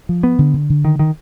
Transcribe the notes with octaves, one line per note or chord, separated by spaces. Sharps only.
F3
B3
D3
D3
D3
D#3
D#3